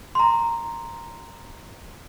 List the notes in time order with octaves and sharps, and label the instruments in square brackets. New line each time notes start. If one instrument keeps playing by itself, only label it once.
[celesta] A#5 C6